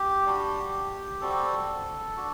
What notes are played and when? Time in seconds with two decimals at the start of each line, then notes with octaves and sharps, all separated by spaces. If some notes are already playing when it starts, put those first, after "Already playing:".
Already playing: G4
0.26 G3 D4 F#4
1.21 G3 C4 F#4 A4
2.17 D4 F#4